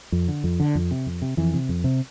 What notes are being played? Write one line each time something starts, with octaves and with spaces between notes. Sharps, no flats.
F2
D3
F2
D3
F2
C3
F2
C3
F2 E3
C3
F2
C3